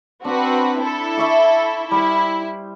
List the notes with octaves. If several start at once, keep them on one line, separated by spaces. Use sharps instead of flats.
C4 D4 F#4 B4
E4 A4
E5 C#6 D6
G3 E4 C5